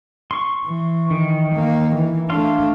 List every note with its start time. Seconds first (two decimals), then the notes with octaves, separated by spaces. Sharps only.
0.31 C6 C#6
0.66 E3
1.10 D#3
1.54 A#3
1.95 E3
2.30 A3 D4 F5 C6